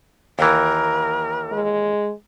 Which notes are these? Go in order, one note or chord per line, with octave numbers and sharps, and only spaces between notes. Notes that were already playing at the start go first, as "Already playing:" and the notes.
D#2 E3 A#4
G#3